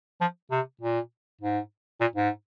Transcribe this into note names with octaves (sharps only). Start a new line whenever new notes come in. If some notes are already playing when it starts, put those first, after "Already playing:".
F3
C3
A#2
G#2
A#2
G#2